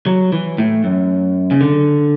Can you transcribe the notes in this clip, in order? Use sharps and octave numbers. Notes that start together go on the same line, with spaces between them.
F#3
E3
A2
F#2
C#3
D3